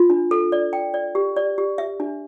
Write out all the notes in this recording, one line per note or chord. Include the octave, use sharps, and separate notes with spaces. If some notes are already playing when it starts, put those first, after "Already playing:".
Already playing: F4
D4
A4
D5
G5
D5
G4
D5
G4
E5
D4